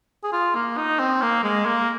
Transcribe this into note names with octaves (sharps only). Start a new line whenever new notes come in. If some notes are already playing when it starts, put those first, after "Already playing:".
G#4
F4
A#3
D#4
C4
A#3
G#3
A#3